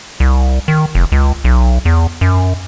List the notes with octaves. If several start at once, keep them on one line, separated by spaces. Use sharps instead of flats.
C2
D#3
F1
C#2
B1
E2
F#2